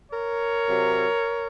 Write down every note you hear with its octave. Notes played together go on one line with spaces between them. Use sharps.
A#4 C#5
C3 F#3